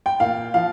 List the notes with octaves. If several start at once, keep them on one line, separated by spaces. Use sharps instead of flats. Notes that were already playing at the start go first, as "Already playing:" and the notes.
G5
A#2 F5
F3 F5